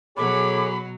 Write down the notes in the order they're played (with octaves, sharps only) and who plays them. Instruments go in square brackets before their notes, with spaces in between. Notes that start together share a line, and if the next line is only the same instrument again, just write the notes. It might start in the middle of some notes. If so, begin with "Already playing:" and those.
[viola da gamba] B2 F#3 [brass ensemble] G#4 A4 C#5 [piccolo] B5 [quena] D6